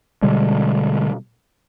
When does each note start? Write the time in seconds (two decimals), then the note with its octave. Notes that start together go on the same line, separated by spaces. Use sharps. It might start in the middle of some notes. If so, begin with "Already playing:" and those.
0.22 B2 D3 G3 G#3